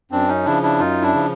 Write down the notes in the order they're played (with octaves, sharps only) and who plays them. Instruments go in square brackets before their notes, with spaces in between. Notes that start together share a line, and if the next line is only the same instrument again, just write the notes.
[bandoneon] F#2 C4 D4
C#4 D#4
C#3 F3 D4 E4
D4 E4
F#2 D#4 F4
D4 E4
C#3 F3